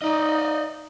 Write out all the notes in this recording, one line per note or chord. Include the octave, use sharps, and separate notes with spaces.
D#4 D5 D#5